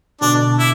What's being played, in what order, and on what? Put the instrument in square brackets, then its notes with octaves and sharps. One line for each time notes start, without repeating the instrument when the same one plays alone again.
[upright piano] B2 D3 [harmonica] D4
[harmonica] E4